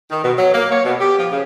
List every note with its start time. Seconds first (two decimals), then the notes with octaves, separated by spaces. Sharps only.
0.11 D#3
0.24 B2
0.37 F#3
0.54 A#3
0.72 C#5
0.84 B2
1.00 G4
1.18 F3
1.31 C#3